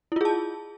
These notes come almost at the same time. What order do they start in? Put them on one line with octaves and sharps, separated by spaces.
E4 F4 G#4 A5